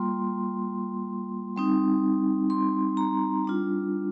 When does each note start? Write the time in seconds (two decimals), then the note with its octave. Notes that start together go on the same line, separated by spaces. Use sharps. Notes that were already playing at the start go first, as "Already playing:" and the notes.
Already playing: G3 A#3 F4 C6
1.56 G3 C4 D#4
2.50 C6
2.97 A#5
3.45 G3 D4 F4